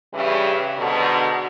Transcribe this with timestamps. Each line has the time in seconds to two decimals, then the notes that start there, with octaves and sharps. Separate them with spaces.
0.14 G2 C#3 E3 G3
0.78 G#2 B2 D3